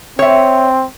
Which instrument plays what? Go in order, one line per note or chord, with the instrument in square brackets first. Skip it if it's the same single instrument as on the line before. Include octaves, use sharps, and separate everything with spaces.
[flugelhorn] C4 [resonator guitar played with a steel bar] C#5 E5